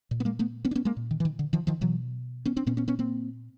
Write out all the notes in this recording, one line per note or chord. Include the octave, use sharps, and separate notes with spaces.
A#2
B3
G#3 A#3
A3 B3
B3 C#4
D4
B3 C#4
G#3 A#3
A#2
D#3
E3
D#3
D3
D#3 F3
D#3 F3
B2 E3 F#3
B3 C#4
C4 D4
A#2 B3 C#4
B3 C#4
B3 C#4
A#3 C4